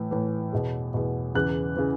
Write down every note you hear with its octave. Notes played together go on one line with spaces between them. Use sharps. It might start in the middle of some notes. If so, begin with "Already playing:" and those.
Already playing: A2 E3
A2 E3
E2 B2
E2 B2
E2 C#3 E3 F#6
C#3 E3